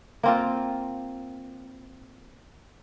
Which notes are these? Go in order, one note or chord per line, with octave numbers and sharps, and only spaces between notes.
A#3 C4 F4